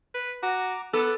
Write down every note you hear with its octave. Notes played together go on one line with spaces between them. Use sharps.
B4
F#4 A#5 D6
B3 A4 B4 D6